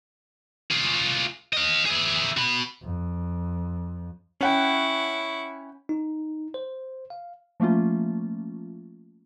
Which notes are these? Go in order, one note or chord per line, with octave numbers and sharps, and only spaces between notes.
F4 G#4
D#5 F5
E4 G#4
F#4 B5
F2
C#4 E4 F#5 G5 C#6
D#4
C5
F5
F3 A3 A#3 C#4 F4